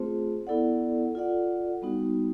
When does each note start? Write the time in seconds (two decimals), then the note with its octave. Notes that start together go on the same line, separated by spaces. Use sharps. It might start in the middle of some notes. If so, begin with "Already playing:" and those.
Already playing: A3 C4 F4 G#4 C5
0.47 B3 E4 A4 D5 F#5
1.15 F4 A4 D5 F#5
1.82 G3 B3 D#4 F#4